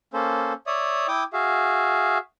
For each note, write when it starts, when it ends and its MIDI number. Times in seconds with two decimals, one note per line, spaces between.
0.13 0.53 58
0.13 0.53 61
0.13 0.53 69
0.13 0.53 72
0.67 1.07 73
0.67 1.07 74
0.67 1.07 76
0.67 1.07 87
1.08 1.24 64
1.08 1.24 79
1.08 1.24 86
1.08 1.24 87
1.33 2.18 66
1.33 2.18 68
1.33 2.18 76
1.33 2.18 77